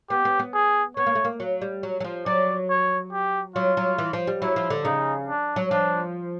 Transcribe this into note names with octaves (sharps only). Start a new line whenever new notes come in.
B3 G4
B3
B3
G#4
B3 C#5
A#3
A3
A#3
F#3
G3
F#3
F#3
F3
F#3 D5
C#5
G4
F#3 F4
F#3
E3
F3
G3
F#3 E4
F3
D3
C#3 D#4
D4
F#3
F3 D4